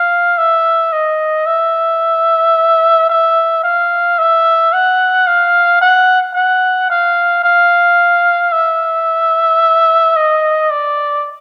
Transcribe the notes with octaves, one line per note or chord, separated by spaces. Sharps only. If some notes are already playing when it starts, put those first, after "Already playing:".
Already playing: F5
E5
D#5
E5
E5
F5
E5
F#5
F5
F#5
F#5
F5
F5
E5
D#5
D5